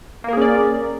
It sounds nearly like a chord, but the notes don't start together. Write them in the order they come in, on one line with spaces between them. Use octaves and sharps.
A#3 A#4 G#4 C#4 D5